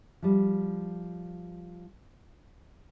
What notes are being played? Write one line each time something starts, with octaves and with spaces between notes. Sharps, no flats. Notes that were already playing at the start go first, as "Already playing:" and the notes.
F3 G3